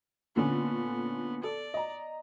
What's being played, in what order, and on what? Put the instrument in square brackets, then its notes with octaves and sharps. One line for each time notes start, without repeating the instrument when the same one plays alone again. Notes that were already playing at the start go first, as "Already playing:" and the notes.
[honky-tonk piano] A#2 D3 C#4 [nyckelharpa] B3
[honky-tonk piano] A4 [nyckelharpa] D5
[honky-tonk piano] D#5 A#5